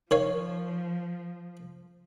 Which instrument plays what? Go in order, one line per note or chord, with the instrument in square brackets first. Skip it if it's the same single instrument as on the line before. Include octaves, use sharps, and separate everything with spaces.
[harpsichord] D#3 C#5 F5 [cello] F3